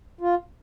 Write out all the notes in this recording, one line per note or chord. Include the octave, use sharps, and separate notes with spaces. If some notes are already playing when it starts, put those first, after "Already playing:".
F4